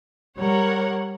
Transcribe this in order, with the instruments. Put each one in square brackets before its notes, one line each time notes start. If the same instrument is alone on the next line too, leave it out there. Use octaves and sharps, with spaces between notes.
[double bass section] G3 [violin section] A#4 C#5 F#5